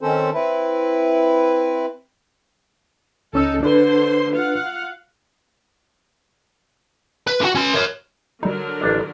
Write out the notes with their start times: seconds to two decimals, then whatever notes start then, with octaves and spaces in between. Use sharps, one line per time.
0.01 D#3 C4 C#4 A4 C5
0.34 C4 E4 B4
3.33 C#2 C#4 D#4 A4 E6
3.63 D3 D4 B4 C5 C6
4.33 F4 F5 F#5
7.27 B4
7.41 D3 F#4
7.55 C#4 C6
7.74 A#4 C#5
8.43 D3 F#3 G3 D#4 A#4
8.81 A1 D4